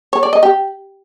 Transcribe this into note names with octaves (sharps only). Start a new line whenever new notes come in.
C#5
D5
D#5
G4